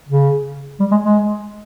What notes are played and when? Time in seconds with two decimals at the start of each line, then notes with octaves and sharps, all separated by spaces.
0.09 C#3
0.80 G3
0.92 G#3
1.04 G#3